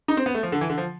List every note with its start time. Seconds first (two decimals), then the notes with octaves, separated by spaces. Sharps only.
0.08 D#4
0.17 C4
0.26 B3
0.35 A3
0.43 F3
0.52 D3
0.61 E3
0.70 D3
0.78 F3